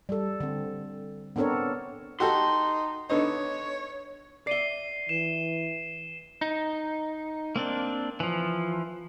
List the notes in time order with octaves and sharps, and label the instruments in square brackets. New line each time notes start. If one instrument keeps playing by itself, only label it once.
[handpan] G3 A4
D3 C4
B3 C4 D4 A4 A#4 C#5
[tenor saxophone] D#4 [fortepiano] F#4 G4 A4 [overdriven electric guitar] C6
[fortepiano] D3 B3 D#4 [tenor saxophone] C#5
[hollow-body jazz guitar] D5 E5 [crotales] C7 D#7 G7
[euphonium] E3 [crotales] E7
[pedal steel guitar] D#4
A#3 C4 D4
E3 F3